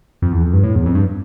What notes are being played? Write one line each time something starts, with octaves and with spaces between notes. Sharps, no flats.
F2
E2
F2
G2
A2
E2
F2
G2